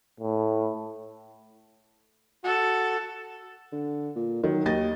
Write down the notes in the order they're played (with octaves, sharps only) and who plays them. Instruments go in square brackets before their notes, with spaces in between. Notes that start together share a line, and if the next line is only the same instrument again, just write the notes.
[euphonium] A2
[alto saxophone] F#4 [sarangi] A4
[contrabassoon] D3
A#2
[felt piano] D#3 [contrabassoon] F#3
[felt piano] D#2 D#5 A6